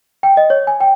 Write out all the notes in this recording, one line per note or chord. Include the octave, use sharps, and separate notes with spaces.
G5
D#5
C#5
G#5
G5